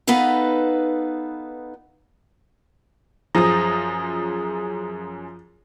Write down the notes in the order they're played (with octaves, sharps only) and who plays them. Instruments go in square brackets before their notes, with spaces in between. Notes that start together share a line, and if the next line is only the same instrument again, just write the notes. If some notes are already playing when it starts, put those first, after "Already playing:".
[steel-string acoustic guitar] B3 D#4 A4 B4 F5
[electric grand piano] F#2 G#4 A#6 [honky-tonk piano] F3 [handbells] A#5 D#6